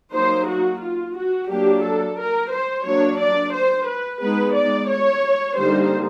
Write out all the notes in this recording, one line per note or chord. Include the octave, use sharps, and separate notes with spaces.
F#3 A#3 D#4 C5
F#4
F4
F#4
F#3 A#3 D4 G4
A4
A#4
C5
F#3 A#3 D4 C#5
D5
C5
B4
G#3 B3 D#4 B4
D5
C#5
D3 G3 A#3 D#4 C5